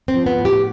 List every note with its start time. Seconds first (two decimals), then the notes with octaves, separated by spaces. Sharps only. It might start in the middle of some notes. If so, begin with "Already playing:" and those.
0.08 C4
0.14 F3
0.26 B3
0.39 A2
0.45 G4